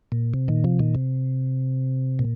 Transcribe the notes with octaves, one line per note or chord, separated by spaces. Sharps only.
A#2
C3
A#2 D#3
C3 F3
A#2 D#3
C3
A#2